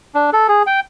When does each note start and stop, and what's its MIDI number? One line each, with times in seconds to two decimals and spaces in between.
0.15 0.30 62
0.33 0.47 69
0.48 0.62 68
0.67 0.80 79